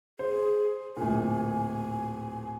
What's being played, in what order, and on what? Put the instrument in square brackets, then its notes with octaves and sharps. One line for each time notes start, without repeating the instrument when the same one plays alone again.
[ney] G#4 [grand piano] C5
[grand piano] D1 A#2 [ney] G#5